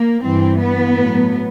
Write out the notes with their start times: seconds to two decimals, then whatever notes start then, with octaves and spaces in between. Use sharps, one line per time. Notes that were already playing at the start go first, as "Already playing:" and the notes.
Already playing: A#3
0.24 G2 E3 C4
0.60 B3
0.96 A2 F#3